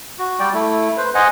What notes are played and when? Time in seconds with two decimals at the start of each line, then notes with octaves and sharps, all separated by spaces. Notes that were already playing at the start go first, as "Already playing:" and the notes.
0.19 F#4
0.40 G3 D5 G5
0.54 A3 E4
0.97 B4 C5
1.15 C5 D#5 F#5 G#5